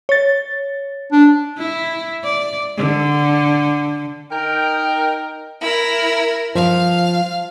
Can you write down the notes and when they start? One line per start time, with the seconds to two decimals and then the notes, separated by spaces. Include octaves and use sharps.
0.09 C#5 A6
1.12 D4
1.58 E4
2.24 D5
2.77 D3
4.31 D#4 A#4 G5
5.61 E4 A#4
6.55 F3 F5